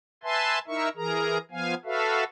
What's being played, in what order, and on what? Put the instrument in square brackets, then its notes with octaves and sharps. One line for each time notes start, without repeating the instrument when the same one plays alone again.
[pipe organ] B4 E5 G#5 A5 C6
D#4 E4 A#4 E5 C#6
E3 G#4 A#4 A#5
F3 B3 F5 G#5
F#4 A4 B4 E5 F5